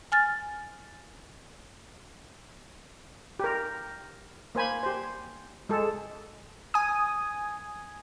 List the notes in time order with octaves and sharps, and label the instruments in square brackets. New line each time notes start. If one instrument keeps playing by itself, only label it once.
[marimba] G#5 F6 A6
[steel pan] G4 A#4
A#3 C5 G#5 B5
G4 C5
G#3 G#4 A4
[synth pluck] G#5 D#6